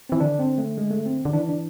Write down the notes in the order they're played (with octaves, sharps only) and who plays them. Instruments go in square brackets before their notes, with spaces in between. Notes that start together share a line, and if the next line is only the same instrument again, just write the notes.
[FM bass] E3 [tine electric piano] C4
[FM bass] D3 [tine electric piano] D4
[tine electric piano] C4
A3
G#3
A3
C4
[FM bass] D3
[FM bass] E3 [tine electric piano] D4
[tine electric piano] D4